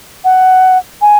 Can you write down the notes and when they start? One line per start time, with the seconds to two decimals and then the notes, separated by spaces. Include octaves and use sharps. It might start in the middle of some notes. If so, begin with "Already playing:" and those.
0.24 F#5
1.01 G#5